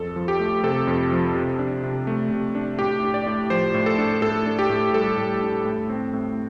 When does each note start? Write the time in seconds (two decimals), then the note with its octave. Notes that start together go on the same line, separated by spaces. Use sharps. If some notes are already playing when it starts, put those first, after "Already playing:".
Already playing: F2 A4
0.16 F3
0.28 G4
0.40 A3
0.63 C3 A4
0.87 F2
1.12 F3
1.35 C3
1.59 D4
1.83 C3
2.07 A3
2.30 C3
2.55 D4
2.79 A2 G4
3.03 D4
3.14 D5
3.26 A2
3.50 F3 C5
3.74 A2
3.86 A4
3.98 D4
4.22 A2 A4
4.46 D4
4.59 G4
4.70 A2
4.94 G3 A4
5.17 A2
5.42 D4
5.65 A2
5.89 C4
6.13 A2